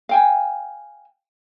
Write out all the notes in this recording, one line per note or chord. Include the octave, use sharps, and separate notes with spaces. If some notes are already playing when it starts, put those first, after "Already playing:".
F5 G5 G#5